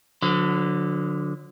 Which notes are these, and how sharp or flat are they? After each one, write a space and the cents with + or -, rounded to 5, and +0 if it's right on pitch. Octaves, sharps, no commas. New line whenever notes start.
D3 +0 F#3 -40 B4 +40